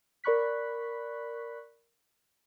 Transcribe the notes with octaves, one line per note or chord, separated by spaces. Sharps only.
A#4 D5 B5 C#6 F#6 B6